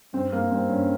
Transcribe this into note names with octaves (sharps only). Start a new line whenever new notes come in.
G2 C4
G2 A#3
G3 C4
G2 C#4